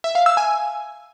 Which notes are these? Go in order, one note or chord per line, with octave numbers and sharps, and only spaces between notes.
E5
F5
E6
G#5